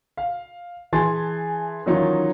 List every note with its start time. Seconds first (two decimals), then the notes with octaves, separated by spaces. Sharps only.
0.17 F5
0.93 E3 G#4 G#5 A5 C6 A6
1.86 D#3 E3 F#3 C#4 D#4 F4